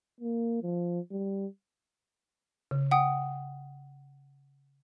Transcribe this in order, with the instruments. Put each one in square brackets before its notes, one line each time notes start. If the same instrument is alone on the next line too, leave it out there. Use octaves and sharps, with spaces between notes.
[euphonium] A#3
F3
G3
[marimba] C#3
[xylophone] F#5 G5 D#6